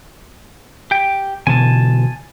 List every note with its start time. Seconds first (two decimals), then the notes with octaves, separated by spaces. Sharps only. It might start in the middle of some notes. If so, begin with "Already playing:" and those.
0.91 G4 G5
1.47 B2 D3 E3 G#5 A5